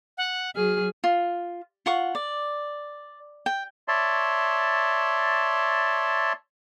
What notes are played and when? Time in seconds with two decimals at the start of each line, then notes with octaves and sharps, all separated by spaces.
0.18 F#5
0.55 F#3 G#4 F6
1.04 F4
1.86 F4 F#5 C#6
2.15 D5
3.46 G5
3.88 C#5 D5 E5 A5 C6